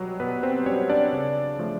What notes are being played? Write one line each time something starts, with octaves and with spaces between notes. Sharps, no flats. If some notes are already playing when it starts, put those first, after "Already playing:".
Already playing: B2 F#3 G3
B2 B3 B4
C4 C5
G3 C#4 C#5
D4 D5
C#3
F3 A3